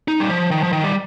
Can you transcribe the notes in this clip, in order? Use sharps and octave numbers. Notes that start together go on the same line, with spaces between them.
D#4
G3
F3
D#3
F3
D#3
G3